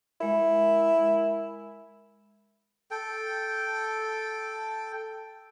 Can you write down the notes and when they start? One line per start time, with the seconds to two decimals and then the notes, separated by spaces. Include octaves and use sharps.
0.21 G#3 E4 A#4
2.91 A4 G5